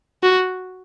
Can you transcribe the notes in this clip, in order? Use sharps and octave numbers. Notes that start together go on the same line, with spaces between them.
F#4